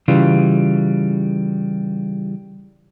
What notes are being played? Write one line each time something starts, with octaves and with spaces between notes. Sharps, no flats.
C#3 E3 G3 F4